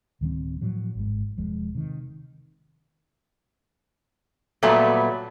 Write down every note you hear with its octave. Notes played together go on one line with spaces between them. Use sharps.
D1 D#3 G3 C4
A2 F3 F#3
G#1 G#2
E1 F3 G#3
C3 D#3
A#2 F#3 G3 A3 B3